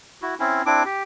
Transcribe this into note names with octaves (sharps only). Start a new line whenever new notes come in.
E4 F#4
C4 C#4 E4
C4 D4 E4 D6
G4